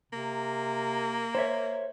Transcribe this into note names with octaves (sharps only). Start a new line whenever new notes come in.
C3 A#3
C5 C#5 E5